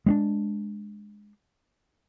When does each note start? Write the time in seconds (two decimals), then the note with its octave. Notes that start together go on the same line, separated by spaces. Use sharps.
0.06 G#3 C4 D4